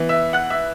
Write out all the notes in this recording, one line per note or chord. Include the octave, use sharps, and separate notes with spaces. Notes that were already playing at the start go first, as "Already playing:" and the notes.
Already playing: E3 B3
E5 E6
F#5 F#6
E5 E6